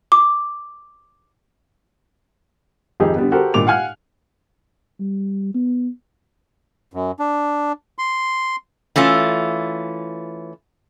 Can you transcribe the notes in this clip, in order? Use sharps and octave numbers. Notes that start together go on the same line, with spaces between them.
D6
G#1 F2 D#4 G4 G#4
D3 G3 B3
F#4 G4 A4 A#4 C5
G2 A#2 D#3 D6 F7
F5 F#5 G#5 F6 F#6
G3
B3
F#2
D4
C6
E3 A3 C#4 F4